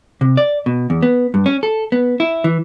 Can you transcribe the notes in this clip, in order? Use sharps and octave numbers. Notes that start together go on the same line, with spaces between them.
C3
D5
B2
E2
B3
G2
C#4
A4
B3
E4
E3